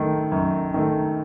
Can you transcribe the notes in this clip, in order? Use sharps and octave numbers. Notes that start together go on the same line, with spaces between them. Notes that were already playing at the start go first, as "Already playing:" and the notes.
Already playing: F#2 D#3 A3
F#2
D#3 A3